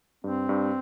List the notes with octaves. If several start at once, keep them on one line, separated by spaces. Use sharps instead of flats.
G2 C4
G2